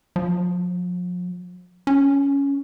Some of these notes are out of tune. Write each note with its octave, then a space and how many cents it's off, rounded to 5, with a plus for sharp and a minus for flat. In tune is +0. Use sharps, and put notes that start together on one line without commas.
F3 +40
C#4 +10